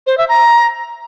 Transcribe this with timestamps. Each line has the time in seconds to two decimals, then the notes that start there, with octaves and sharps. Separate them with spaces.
0.07 C5
0.18 E5
0.29 A#5